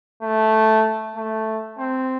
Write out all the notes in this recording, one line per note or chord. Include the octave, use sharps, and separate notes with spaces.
A3
A3
C4